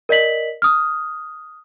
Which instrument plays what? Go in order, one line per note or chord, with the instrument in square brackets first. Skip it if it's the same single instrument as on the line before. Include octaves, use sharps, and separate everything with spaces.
[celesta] A#4 D5 D#5 B6 F#7
D#6 F6